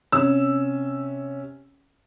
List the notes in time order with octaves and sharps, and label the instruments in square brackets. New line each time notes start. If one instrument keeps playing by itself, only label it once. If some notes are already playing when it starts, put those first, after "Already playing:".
[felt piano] C3 C#4 E6